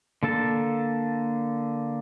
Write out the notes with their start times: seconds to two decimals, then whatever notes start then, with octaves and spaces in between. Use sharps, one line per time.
0.23 D3 A#3 A4 A5